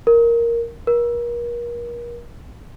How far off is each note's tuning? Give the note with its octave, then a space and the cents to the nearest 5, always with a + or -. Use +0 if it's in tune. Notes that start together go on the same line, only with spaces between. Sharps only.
A#4 +0
A#4 +35